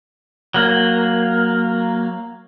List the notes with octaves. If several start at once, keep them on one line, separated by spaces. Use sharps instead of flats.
F#3 A#3